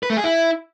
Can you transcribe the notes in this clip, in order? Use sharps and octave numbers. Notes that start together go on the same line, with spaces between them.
B4
A3
G#4
E4